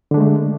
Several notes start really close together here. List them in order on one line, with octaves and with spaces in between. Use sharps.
D3 D4 G#3 A3